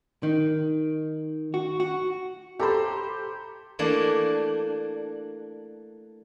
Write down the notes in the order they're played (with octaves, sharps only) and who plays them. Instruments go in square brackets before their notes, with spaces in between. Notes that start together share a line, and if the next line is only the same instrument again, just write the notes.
[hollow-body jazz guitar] D#3
F#4
F#4
[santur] G4 C5 [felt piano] A4 A#5 B5
[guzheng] E3 A3 A#3 D4